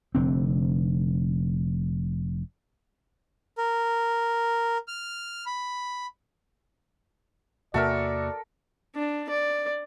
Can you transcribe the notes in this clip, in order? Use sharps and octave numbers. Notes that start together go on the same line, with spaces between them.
F1 D3 C4
A#4
F6
B5
E2 C3 A#3 F#4 A4 A#4 D5 E5
D4
D5